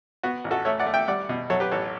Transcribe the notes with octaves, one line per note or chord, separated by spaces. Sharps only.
B3 F#4
A1
F#4 A4
A3 C#5 E5
D5 F#5
A3
E5 G5
G3 D5 F#5
B2
F#3 A4 C#5
G4 B4
A1 A4 C#5